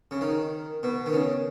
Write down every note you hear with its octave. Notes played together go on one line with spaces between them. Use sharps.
C#3
D#3
B2
D#3
C#3